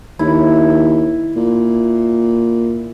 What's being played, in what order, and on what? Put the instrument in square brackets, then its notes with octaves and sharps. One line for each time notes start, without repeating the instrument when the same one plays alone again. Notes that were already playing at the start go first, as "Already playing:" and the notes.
[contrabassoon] D#2 [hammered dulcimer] E4
[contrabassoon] A#2